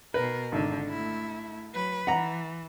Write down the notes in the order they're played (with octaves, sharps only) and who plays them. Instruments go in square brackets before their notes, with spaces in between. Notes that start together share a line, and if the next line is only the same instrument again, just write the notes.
[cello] B2 A#4 [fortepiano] B4
[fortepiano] G#1 [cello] D3
[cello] A3 E4
F#3 B4
[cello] E3 [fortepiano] F#5 A#5